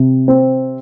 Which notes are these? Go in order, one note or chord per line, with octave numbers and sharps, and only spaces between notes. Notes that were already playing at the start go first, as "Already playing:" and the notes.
Already playing: C3
C4